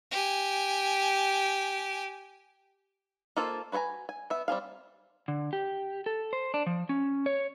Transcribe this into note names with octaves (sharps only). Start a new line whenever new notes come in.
G4 G#5
A#3 D#4 F4 A4 C5
F#4 B4 C5 G#5 A#5
G#5
B3 E5
G3 C4 G#4 F5
D3
G4
A4
C5
D4
F3
C#4
C#5